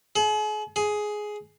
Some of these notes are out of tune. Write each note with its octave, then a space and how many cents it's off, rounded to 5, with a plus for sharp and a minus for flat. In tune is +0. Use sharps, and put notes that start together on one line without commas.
G#4 +40
G#4 +10